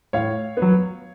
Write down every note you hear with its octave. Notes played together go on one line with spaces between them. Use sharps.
A2 C#5 F5
B3
F#3